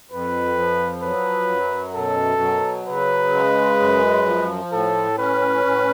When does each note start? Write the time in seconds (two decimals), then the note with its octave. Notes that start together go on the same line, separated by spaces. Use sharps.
0.12 F2 B4
0.58 F3
1.03 F#3 B4
1.49 F#2
1.96 B2 A4
2.41 F#3
2.87 C#3 B4
3.34 G#3
3.80 F#2
4.26 F3
4.72 A2 A4
5.18 C#4 B4
5.65 A2